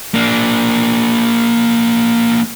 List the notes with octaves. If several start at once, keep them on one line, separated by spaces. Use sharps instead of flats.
A#3 D4